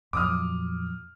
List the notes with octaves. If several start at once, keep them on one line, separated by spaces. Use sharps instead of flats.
F2 A#2 F#3 D6 D#6 F6